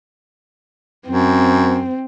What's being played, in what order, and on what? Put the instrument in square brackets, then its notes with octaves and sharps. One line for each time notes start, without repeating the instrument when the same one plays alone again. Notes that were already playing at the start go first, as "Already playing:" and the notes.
[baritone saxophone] F#2 [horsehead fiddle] C4